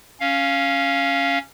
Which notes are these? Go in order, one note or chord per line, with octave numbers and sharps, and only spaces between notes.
C#4 F5